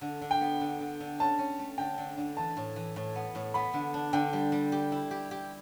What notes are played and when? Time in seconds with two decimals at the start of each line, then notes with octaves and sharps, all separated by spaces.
0.01 D3
0.21 D3
0.31 G5
0.41 B3
0.61 D3
0.80 D3
1.00 D3
1.20 C#4 A5
1.38 C#4
1.59 A3
1.78 D3 G5
1.98 D3
2.17 D3
2.37 E3 A5
2.57 A2
2.76 E3
2.96 A2
3.15 B3
3.35 A2
3.54 B3 B5
3.73 D3
3.94 D4
4.13 D3 G5
4.33 G3
4.52 G3
4.72 G4
4.92 E4
5.11 G4
5.31 G4